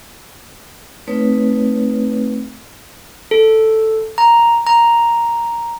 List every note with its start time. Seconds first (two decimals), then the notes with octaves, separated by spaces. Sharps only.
1.08 A3 C4 D#4 B4 C#5
3.31 A4
4.18 A#5
4.67 A#5